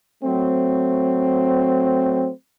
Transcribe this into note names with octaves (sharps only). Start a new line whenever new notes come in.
F#3 A3 C4